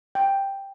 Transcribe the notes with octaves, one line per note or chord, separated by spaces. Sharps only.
G5